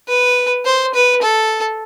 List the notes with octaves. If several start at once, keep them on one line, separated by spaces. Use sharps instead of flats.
B4
C5
B4
A4